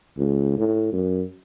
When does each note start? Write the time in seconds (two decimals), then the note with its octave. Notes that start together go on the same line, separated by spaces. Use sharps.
0.18 C#2
0.57 A2
0.93 F#2